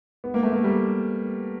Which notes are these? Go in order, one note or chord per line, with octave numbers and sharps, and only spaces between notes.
B3
A#3
A3
A#3
G3